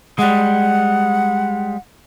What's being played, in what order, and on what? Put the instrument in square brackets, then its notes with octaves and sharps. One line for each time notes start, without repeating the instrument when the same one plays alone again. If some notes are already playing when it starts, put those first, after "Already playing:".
[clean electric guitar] G3 G#3 [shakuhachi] F#5